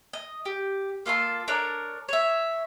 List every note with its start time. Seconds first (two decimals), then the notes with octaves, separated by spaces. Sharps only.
0.13 D#5
0.45 G4
1.06 A#3 F4 A4 C6
1.48 D4 A4 A#4 C#5
2.09 C#5 E5